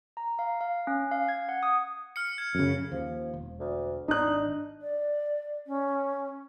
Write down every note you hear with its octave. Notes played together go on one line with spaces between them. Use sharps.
A#5
F5
F5
C#4
F5
G#6
F#5
D#6
F6 C#7
G#6
F#2 C#3
D#2 F3
E1
D2
G#1 D4 D#4 F#6
D5
C#4